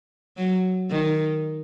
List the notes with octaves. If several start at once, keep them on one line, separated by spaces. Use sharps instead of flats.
F#3
D#3